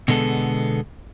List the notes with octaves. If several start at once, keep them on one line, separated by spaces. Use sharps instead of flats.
B2 D3 G#3 B3 A4